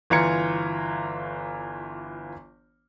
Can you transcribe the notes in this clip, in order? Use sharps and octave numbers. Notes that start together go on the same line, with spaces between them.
G1 E3 F4 A#5 G#6 C#7